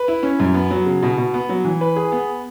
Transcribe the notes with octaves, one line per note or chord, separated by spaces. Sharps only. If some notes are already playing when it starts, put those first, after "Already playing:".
Already playing: B4
E4
C#4
F#2
B3
F#3
C#3
B2
B2
B3
F#3
E3
B4
G#4
B3